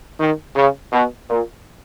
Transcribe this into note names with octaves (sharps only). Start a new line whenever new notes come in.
D#3
C#3
B2
A#2